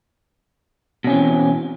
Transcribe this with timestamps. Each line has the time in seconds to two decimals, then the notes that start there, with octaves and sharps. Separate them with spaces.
1.04 B2
1.07 C#4
1.10 C4
1.12 E3